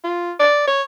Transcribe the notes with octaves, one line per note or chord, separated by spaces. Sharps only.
F4
D5
C#5